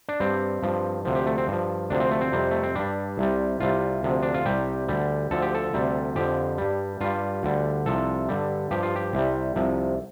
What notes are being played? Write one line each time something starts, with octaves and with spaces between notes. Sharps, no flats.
D4
G2 G3 C4
G2 F3
D2 C3 F3
G4
A3
C4
G2 F3
D2 C3 F3 D4
C4
A3
C4
F2 C3 G3
A3
C4
G2 G3 D4
C2 C3 G3
C2 C3 G3 F4
D2 C3 F3
D4
F4
C2 C3 G3 G4
D2 D3 G3
D2 D3 F3 A4
G4
A4
D2 C3 G3
F2 D3 F3 G4
G2 G3
G2 G3 F4
D2 D3 G3
C2 C3 F3 A4
G2 D3 G3
G2 F3 G4
F4
G4
C2 C3 G3
C2 C3 F3